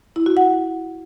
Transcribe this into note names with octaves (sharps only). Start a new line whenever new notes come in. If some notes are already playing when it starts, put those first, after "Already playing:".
E4
F#4
F#5